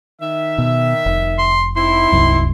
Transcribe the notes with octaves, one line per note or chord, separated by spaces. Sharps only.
D#3 E5
B2
F1
C6
C4 D#4 E4 C6
D1 C2 F#2